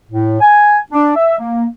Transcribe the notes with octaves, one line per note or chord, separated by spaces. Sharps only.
A2
G#5
D4
E5
A#3